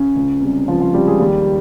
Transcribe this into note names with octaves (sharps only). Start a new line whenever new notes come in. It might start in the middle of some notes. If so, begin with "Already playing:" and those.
Already playing: C#3 C#4
C#2
C3 G3
C#2 F3 F4
F3 F4
C3 G3 G4
G#3 G#4
D#2 G3 G4